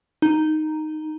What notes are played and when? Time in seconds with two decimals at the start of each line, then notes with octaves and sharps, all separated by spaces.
0.22 D#4